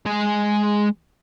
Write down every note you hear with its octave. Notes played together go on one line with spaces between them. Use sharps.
G#3 G#5